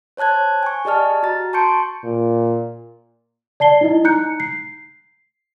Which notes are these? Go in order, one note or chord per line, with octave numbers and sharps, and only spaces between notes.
C5 C#5 A5 F#6 G#6
G#5 C#6
G4 G#4 D5 D#5 A5 F6
F#4 A#5 A6
A5 C6 C#6 G6 C#7 D7
A#2
D5 A5 C7 G7
D#4 E4 D#5
D#4 A#5 F#6 G6 C#7
C7